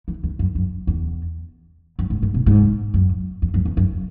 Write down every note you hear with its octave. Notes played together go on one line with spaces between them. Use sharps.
E3
E2
F#2
F#2
E2
F#2
G#2
G#2
B2
G#2
F#2
E2
F#2
E2
F#2